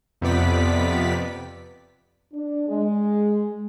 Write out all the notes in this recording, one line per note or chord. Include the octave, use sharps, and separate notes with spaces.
F2 C3 B3 D5 B6
D4
G#3